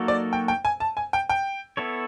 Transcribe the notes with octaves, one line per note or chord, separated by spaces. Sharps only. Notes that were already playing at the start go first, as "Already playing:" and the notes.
Already playing: F#3 A#3 D#4 F#4 A4
D5
G5
G5
G#5
A5
G#5
G5
G5
B3 E4 A4 C#5